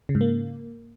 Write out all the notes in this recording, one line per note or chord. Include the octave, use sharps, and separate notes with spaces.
C#3
G#2
A#3